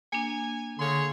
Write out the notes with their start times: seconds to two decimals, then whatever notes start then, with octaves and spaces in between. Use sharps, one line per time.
0.13 A#3 D4 G#5
0.79 D3 G#4 C#5 F5 C6